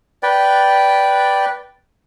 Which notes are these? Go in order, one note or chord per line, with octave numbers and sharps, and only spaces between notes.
B4 D5 G5